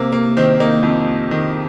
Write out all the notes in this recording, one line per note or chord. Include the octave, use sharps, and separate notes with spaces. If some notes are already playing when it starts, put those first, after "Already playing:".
Already playing: C3 A#3
A#3
D#3 C4
A#3 D#4
F2
D#3